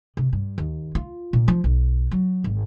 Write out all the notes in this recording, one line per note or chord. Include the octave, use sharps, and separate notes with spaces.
C3
G2
D#2
F4
A#2
F3
B1
F#3
G#1